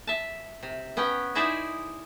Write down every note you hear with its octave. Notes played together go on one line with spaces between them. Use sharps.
E5 A5
C3
B3 C#4 G5
D#4 E4 G#4 C5 D5 E5